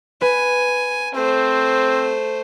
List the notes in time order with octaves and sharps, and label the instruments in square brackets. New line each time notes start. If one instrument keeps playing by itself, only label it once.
[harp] B4 [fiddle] G#5
[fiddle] A3 C5 [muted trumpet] C4